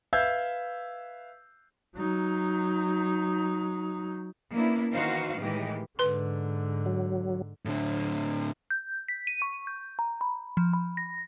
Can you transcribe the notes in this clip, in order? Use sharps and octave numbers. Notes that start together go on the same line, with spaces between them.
B4 E5 F5 E6 G6 G#6
F#3 D#4
A#3 B3 C#4 D4 E4
D#3 E3 D#4 F#4 C5 F5
A2 D#3 E3 G#3 G4
G#2 D3 B4 C6
F#3
A2 D3
G6
B6
D#7
C#6
G6
A#5
B5
F3
B5
A#6